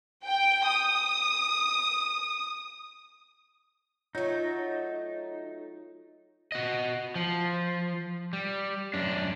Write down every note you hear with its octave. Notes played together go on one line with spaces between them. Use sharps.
G5
D#6
F#3 A3 D#4 F4 G6
F#4 D#5
F3
G3
F#2 D4